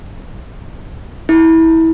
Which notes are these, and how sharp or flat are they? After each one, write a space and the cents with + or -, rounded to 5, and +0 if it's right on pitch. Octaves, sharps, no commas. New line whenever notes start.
E4 -20